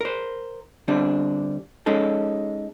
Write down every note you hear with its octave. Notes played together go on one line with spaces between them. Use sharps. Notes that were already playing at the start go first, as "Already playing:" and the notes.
A#4 C5
D3 G3 C4 D4
G#3 C#4 D#4 A4